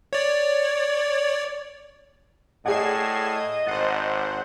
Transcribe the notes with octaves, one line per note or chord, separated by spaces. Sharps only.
C#5 D5
A2 G#4 D5 D#5 F#5 G#6 C7 E7
G#1 C5 F#5 A6 C7